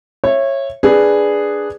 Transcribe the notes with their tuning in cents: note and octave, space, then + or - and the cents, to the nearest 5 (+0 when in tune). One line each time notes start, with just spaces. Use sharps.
C#5 -20 E5 +15
D4 +0 G#4 -5 B4 +0